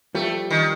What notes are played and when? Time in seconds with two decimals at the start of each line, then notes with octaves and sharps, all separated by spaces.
0.15 F3 G3 A3
0.50 D#3